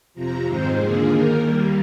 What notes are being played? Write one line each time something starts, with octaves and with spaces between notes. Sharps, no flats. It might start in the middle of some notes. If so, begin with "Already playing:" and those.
F2 C3 F3 A#5
G#2 D#3 G#3 C4 C5
D#2 D3 F3 A#3 G#4
D#2 D#3 A#3 A#4
D#2 D#3 G3 A#3